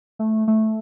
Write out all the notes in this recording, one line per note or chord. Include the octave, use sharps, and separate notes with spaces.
A3
A3